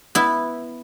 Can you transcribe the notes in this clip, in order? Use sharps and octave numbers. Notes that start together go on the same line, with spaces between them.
B3 E4